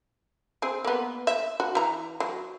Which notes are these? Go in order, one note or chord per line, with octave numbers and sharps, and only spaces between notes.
C4 G#4
A#3 B3
E5
F#4
E3 A#5
F#3